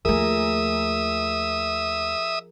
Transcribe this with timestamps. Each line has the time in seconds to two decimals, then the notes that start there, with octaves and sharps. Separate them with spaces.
0.05 D#2 F3 A3 G#4 A#4 E5 D#6